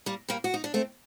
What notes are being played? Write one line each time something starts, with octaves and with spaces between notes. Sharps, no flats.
G3 A#3
G3 A#3
F#4
D#4
D4
A3 C4